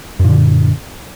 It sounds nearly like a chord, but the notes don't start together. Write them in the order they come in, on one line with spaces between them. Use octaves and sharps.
F#2 A#2 D3